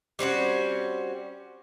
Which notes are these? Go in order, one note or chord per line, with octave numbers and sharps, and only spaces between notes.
G3 C4 C#4 F#4